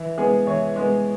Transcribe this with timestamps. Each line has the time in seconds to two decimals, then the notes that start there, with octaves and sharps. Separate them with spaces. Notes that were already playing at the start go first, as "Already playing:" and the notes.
Already playing: E3
0.18 G#3 B3 G#4
0.46 E3 C#5
0.76 G#3 B3